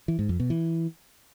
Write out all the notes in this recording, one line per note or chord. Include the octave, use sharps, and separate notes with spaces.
E3
G#2
F2
B2
E3